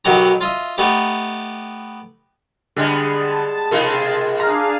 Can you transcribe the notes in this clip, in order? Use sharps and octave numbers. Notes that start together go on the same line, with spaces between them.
B1 D#3 F#3 F#4 G4 A#5
F4 D#5 E5
A3 B3 D#4 G4
D3 G3 G#3 B3
A5
B2 G#3 D#4 F4 A4 A#4
D4 G#4 F5 A#5